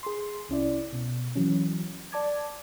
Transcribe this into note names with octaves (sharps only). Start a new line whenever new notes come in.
G#4 C6
C2 C#4 E4 D5
B2
E3 F#3 C#4
D5 A5 D6 G#6